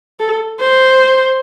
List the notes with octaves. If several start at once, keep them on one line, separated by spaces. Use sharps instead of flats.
A4
C5